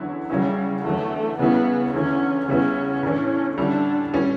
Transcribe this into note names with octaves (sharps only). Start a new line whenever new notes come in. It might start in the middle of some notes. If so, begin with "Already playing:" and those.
Already playing: E2 D3 F#3 C#4 E4
C#3 F#3 G3 C#4 E4
E2 D3 F#3 A3
C#3 E3 G3 B3 C#4 E4
E2 D3 A3 C#4 E4
C#3 G3 B3 C#4 E4
A2 E3 A3 D4
D3 G3 C#4 D4 E4
A2 G3 C#4